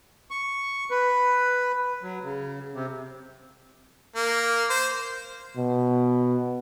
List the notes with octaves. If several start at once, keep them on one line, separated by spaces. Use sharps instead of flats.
C#6
B4
F#3
C#3
C3
A#3
C5
B2